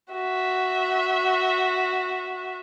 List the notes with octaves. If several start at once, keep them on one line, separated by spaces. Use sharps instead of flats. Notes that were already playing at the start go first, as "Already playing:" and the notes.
F#4 E5